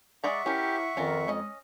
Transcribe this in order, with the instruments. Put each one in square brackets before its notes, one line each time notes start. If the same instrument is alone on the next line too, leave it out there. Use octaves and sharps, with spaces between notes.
[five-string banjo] G#3 D5 A#5 [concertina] E5 F#5 C#6
[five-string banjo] C#4 A#4 [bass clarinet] E4 [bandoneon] G4
[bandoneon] F2 [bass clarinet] D#3 [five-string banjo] C#4 F4 A#4
[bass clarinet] G#3 [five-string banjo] C#4 D#5